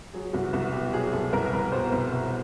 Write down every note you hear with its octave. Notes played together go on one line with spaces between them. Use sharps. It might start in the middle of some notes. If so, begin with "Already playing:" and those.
F#3 G#4
C2 F#4
C2 F#4
B2 G4
F#3 G#4
C2 A4
C2 A#4
C2 B4
B2 C5
C2
B2